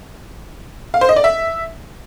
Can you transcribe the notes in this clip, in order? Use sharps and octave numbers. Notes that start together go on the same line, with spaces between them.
F5
C5
D#5
D5
E5